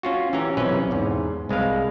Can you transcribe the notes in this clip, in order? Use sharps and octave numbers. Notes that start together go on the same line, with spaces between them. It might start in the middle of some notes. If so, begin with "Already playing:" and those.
C#4 F4 F#4
E3 C#4 G4 A#5
B1 C3 E3 C#4 B4
E2 G#2
C2 G#3 B4 F5